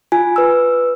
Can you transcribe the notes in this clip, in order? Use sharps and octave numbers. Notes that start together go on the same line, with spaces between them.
F4 G#5
B4 E6